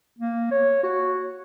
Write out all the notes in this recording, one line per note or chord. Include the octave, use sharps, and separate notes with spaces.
A#3
C#5
F#4